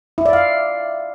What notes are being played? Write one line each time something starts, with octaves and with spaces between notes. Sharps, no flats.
E4
D5
F5